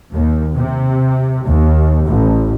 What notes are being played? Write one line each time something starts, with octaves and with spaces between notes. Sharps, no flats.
D#2
C3
D#2
A1